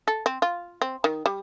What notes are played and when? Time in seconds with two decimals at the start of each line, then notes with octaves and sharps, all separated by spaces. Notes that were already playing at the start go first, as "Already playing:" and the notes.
0.08 A4
0.26 C4
0.42 F4
0.82 C4
1.04 D#3
1.26 G3